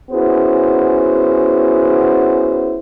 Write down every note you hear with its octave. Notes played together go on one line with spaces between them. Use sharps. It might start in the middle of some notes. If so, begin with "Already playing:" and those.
B3 C#4 E4 F#4 G#4 C5